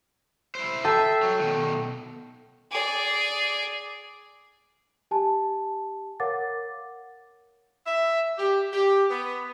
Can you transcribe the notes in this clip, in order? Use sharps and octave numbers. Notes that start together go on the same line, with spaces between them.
E4 C5
A4 D#5 E5 G5 C7
F#3
B2 D#3
G#4 D5
G4 G#5 A5
A#4 C#5 F5 F#5 D6 A6
E5
G4
G4
B3